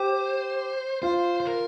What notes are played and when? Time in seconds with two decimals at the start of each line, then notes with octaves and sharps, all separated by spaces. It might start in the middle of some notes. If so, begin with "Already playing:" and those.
Already playing: G4 C5
1.02 F4 C5
1.40 C5
1.46 A#4